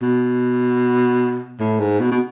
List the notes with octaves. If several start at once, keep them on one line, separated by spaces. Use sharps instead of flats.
B2
A2
G#2
B2
B2